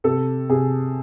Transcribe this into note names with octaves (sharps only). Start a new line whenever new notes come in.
C3 A4
C3 G#4